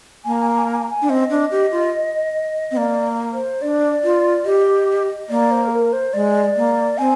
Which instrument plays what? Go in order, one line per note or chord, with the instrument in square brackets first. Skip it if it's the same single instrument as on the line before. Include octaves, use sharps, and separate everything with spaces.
[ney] A#3 [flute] G#5
[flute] A#5
G#5
A#5
G#5
A#5
G#5
A#5
G#5
[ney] D4
[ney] C4 [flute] D#5
[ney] D4
G4
F4
C4
[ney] A#3 [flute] D5
[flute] C5
[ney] D4 [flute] D5
[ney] F4
[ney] G4 [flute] D#5
[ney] A#3 [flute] D5
[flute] C5
G#4
A#4
C5
[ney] G#3 [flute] D5
[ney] A#3
[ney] C4 [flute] G#5